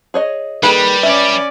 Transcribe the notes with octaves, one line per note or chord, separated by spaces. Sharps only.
G#4 C#5 D#5
D#3 G3 A#3 G#4 B4
C#4 D5 E5